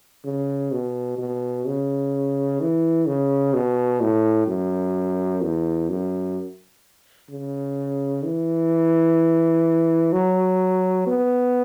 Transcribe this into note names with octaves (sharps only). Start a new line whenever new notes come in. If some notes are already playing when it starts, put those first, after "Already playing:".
C#3
B2
B2
C#3
E3
C#3
B2
A2
F#2
E2
F#2
C#3
E3
F#3
B3